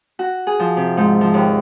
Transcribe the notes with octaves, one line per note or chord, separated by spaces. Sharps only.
F#4
G#4
F3
C3
G#2
F3
D#2